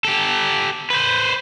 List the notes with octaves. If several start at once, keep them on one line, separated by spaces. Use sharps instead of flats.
G4 A4
B4 C5